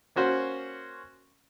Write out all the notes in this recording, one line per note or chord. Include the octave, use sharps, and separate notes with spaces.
A#3 C#4 F#4 C5